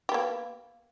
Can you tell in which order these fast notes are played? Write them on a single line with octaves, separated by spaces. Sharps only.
G4 B3 A#3